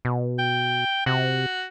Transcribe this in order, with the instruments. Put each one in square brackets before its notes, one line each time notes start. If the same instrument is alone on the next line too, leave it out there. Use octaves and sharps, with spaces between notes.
[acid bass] B2
[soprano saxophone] G5
[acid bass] C3 [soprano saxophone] F#4